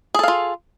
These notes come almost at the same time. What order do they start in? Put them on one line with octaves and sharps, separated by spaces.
G#4 A4 F5 F4